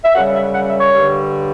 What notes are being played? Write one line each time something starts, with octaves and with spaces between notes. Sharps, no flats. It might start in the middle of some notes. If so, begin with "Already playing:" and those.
E5
F#2 C#3 G3 F#5
E5
F#5
E5
C#5
G2 D3 G3